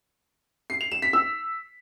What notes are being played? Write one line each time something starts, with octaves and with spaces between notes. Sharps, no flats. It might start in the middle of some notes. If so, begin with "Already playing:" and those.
C7
F7
E7
B6
E6